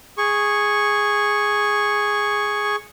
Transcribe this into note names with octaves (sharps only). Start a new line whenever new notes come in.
G#4 C#6